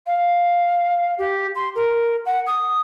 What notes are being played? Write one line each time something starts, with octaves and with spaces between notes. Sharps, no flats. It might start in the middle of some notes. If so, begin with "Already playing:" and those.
F5
G4
C6
A#4
F#5
D#6